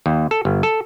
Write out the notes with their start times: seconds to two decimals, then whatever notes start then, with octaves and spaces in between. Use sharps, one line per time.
0.06 D#2
0.31 A4
0.45 G1
0.63 A4